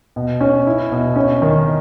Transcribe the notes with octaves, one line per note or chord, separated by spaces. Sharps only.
B2
C#4
E4
B2
C#4
D#3